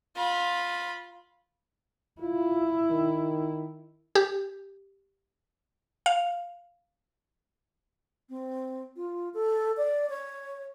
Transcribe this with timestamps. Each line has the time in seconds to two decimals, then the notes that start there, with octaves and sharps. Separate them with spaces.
0.16 F4 B5
2.21 E4 F4
2.90 D#3
4.15 G4
6.06 F5
8.29 C4
8.96 F4
9.34 A4
9.77 D5
10.10 C#5